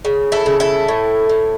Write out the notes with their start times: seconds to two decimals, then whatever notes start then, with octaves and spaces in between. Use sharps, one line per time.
0.05 C#3
0.32 E4 A4
0.46 C#3
0.60 E4 A4
0.88 A2
1.29 A2